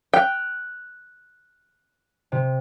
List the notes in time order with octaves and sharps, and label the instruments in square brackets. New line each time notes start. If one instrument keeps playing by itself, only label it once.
[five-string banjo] G5 [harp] F6 F#6
[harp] C3